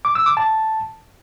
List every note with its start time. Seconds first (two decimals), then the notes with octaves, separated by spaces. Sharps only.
0.05 D6
0.15 E6
0.26 D6
0.37 A5